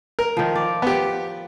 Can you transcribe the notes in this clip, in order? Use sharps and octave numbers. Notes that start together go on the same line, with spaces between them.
A#4
D#3 F3
D5
B3 G4